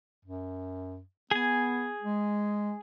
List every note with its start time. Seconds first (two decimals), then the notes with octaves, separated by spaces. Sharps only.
0.25 F#2
1.31 B3 G#4 G#5
2.02 G#3